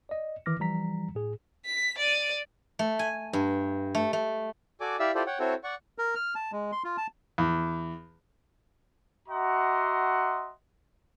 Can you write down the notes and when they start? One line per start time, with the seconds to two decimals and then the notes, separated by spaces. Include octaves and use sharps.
0.09 D5 D#5
0.46 D#3 E3 D6 F6 A#6
0.60 E3 F3 G3 A#5 B6
1.15 A2 G#4
1.65 B6
1.98 D5 D#7
2.79 A3
2.99 G#5
3.33 G2
3.95 A3
4.13 A3
4.81 F#4 A4 D5 G#5 D6
4.99 E4 G4 D5 E5 F5 E6
5.15 E4 F4 G4 A4 C5 D5
5.27 C#5 F#5 G5
5.39 C4 E4 F#4 A4 C5 C#5
5.64 D5 F#5 C#6
5.98 A#4
6.15 F6
6.35 A5
6.52 G#3
6.72 C6
6.84 F4
6.97 A5
7.38 E2
9.28 F#4 D#5 E5 F#5 A#5 C6